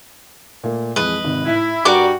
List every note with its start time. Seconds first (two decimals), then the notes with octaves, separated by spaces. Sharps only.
0.64 A#2 A3 A#3
0.96 F2 E3 G#3 B4 D#5
1.24 G#1 C3
1.46 A2 E4
1.85 G2 G3 F#4 A#4 D5 D6